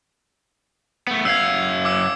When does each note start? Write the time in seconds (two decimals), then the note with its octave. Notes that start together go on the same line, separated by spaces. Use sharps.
1.07 A3 B3
1.25 F#2 F5 E6 G#6
1.85 D6 E6